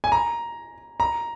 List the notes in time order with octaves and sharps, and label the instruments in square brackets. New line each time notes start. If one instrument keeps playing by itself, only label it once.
[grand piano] G#5
A#5
A#5